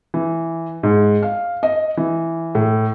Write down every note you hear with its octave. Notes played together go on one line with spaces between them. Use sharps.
E3
G#2
F5
D#5
E3
A2